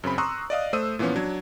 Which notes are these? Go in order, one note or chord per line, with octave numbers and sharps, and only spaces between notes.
F#2 C#3 C4 B5
A#5 C6 C#6 D#6 E6 F#6
D5 D#5 F5 D#6
A3 C5 D#6 E6 D#7
A#2 E3 F3 B3 C#4
F#3 D4 G#6